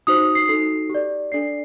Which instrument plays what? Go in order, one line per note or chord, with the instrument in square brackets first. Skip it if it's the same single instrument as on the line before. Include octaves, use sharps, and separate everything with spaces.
[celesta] D#4 F#4 C5 D#6
C7
D#4 F#4 A4 C7
G4
D5
D4 A4 D5 C7